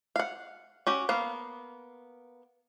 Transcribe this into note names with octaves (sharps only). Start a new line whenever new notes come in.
F5 F#5
C#4 F#4 G4
A#3 B3 F5